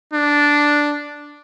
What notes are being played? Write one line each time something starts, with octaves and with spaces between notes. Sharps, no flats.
D4